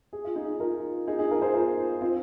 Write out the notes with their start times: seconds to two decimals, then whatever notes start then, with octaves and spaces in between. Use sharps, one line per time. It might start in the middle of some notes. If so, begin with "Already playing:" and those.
0.13 G#4
0.25 F4
0.36 D#4 G#4
0.60 F4 A#4
1.07 D#4 G#4
1.19 D#4 G#4
1.31 F4 A#4
1.42 G#4 C5
1.53 F4 A#4
2.01 C4 F4